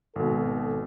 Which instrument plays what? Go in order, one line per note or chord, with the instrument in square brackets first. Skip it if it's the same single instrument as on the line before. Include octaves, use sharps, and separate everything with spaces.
[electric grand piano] G#1 B2 [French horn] A4